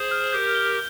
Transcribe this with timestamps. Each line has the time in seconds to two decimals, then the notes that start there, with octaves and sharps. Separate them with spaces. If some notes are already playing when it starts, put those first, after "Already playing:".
Already playing: G#4 C5
0.11 F6
0.32 G4 A#4 G6
0.55 G7